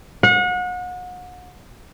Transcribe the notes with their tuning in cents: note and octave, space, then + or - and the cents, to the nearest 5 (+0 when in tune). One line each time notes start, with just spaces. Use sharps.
F#5 -35